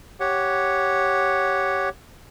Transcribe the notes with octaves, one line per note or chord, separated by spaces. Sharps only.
G4 C#5 F#5